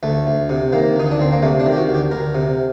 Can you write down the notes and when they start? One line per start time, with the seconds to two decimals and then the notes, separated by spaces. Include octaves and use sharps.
0.03 D2 A3
0.27 D2
0.49 C3
0.72 D#3 A#3
0.96 D2 D#4
1.11 D4
1.19 D2 C4
1.32 A#3
1.42 C3 A3
1.60 D4
1.66 D#3
1.72 G4
1.77 F#4
1.89 D2
1.94 G4
2.11 D2 A#4
2.35 C3